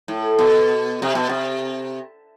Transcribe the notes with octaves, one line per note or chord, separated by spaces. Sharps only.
A2
B2
C3
B2
C3